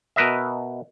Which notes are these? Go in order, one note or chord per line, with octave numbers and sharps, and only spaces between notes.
B2 A#4 B4 D#5 E5